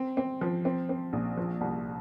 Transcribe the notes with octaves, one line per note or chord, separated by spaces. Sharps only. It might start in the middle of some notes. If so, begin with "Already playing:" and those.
Already playing: C4
C4
F3
C4
C4
A#1
F3
C2